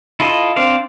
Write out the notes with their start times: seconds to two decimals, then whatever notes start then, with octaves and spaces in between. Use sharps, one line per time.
0.20 E4 F4 A4 D#5
0.56 C4 D4 C5 D5 F5